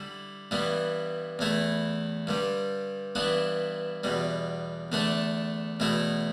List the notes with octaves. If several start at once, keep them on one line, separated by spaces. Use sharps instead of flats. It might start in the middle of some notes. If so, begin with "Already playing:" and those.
Already playing: D3 G3 E4
G2 E3 G3 B3
E2 E3 A3 E4
G2 D3 G3
G2 E3 B3 D4
E2 B2 G3
E2 D3 A3 D4
E2 B2 A3 E4